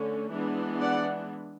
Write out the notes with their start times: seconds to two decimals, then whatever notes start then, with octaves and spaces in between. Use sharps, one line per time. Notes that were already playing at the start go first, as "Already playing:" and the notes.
Already playing: D3 A3 C#4
0.31 E3 G#3 B3 D4
0.80 D5 F#5